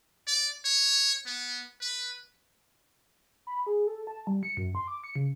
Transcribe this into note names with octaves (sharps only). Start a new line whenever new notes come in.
D5
C#5
B3
B4
B5
G#4
A4
A5
G3
C#7
F#2
C6
D6
C#7
C#3